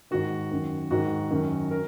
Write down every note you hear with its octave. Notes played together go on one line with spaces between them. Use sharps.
G#2 D#3 F#4
F#2 D#3
G#2 D#3 F#4
F#2 D#3
A#4